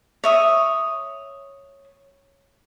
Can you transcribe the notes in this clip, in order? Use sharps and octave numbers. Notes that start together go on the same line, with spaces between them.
C#5 E5 D#6